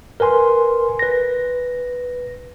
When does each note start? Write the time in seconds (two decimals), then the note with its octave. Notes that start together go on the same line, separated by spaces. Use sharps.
0.20 A#4 B4 G#5 C6
0.99 B4 A#6